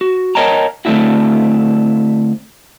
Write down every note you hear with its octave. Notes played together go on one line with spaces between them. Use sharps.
F#4
A#4 C#5 D#5 G5 A5 A#5
D3 A3 C4 D4 E4 F#4